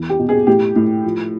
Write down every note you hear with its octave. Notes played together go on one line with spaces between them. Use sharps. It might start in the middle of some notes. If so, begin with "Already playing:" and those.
Already playing: E2
G4
B2
G#4
A2 G4
A2
F3